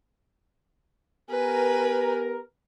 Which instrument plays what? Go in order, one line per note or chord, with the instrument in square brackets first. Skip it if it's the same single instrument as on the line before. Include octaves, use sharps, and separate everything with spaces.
[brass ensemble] B3 G4 A#4 [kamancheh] B4 G#5